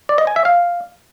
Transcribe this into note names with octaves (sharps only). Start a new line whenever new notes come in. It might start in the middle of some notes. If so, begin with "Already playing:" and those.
D5
D#5
G#5
E5
F5